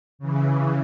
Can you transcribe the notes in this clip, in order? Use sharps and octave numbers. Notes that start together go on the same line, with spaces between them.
C#3 E3